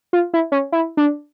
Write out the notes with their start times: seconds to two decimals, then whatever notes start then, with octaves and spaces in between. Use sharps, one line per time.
0.13 F4
0.34 E4
0.52 C#4
0.72 E4
0.97 D4